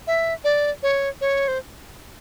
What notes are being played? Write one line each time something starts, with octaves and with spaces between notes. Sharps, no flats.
E5
D5
C#5
C#5
C5